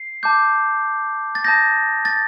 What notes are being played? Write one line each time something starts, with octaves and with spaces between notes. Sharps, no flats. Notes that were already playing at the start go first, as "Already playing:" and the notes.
Already playing: C7
A5 D6 G6
A6
A5 D#6 G6 A#6
A6